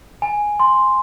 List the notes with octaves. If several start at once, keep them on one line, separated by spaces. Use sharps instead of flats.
G#5
C6